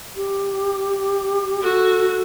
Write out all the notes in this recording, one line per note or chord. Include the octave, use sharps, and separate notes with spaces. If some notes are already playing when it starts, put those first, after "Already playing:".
G4
F#4 A4